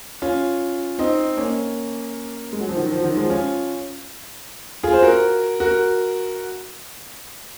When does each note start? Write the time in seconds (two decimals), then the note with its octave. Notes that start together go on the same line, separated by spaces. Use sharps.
0.22 C#4 F4
0.99 C4 D#4
1.37 A#3 C#4
2.53 G#3
2.60 F#3
2.69 F3
2.76 D#3 F#3
2.92 F3
3.04 D#3 F#3
3.17 F3 G#3
3.30 C#4 F4
4.83 F4 G#4
4.93 C5
5.03 F#4 A#4
5.60 F#4 A#4